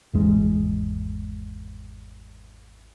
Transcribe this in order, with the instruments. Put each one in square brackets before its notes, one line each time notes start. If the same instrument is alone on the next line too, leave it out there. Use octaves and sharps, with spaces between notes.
[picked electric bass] G#1 E2 G#3